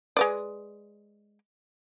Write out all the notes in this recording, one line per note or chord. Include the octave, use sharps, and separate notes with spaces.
G#3 B4 D5